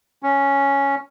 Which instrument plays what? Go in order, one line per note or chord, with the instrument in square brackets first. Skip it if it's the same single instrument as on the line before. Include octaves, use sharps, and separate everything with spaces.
[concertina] C#4